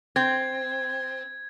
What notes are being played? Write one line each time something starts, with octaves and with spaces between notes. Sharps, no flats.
C4 G#6